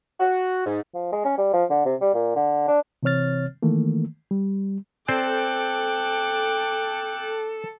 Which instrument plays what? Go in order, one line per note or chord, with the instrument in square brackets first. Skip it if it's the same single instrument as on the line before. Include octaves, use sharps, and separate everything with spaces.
[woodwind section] F#4
G#2
[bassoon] F3
G#3
C#4
G3
F3
D3
C3
G3
A#2
D3
D4
[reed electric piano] C3 E3 C4 C#5 F6 A6
D#3 E3 A3 A#3
G3
[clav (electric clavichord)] C4 C5 D5 [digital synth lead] A4 [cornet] G5 [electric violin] D6 F#6